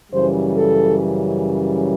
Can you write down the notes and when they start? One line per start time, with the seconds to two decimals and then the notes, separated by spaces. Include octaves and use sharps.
0.11 F#2 C#3 E3 G3 C5
0.55 A4